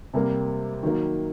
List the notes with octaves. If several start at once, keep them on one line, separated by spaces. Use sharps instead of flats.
C3 G3 A#3
D#3 F#3 A#3